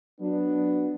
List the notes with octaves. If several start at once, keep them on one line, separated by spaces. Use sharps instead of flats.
F#3 B3 D4